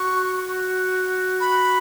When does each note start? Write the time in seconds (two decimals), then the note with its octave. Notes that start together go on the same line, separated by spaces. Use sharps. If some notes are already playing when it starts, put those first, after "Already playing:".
Already playing: F#4 C#6
1.40 B5